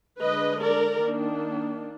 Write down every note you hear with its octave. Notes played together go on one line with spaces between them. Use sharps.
D3 G#3 D4 B4 D#5
A#4 D5
D#3 A#3 D4